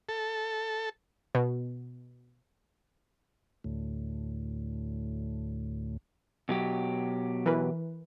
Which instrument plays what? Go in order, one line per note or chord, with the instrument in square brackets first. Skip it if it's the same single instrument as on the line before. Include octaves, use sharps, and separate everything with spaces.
[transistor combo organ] A4
[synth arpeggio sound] B2
[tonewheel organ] D2 A2
[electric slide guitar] B2 F#3 G4
[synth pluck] E3 A#4 B4